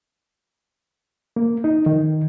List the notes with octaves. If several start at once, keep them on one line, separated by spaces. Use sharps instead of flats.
A#3
D#4
D#3